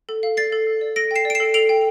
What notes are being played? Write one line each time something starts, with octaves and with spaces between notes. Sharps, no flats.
A4
F5
D5 A6 C7
A4
A4
D5
A4 A#6 D7
G5 C7 E7
D5 D7
C7 E7
A4
A4 D7 F7
G5